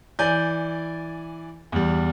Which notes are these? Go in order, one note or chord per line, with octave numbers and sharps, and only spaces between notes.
E3 D5 G#5 G6
E2 G3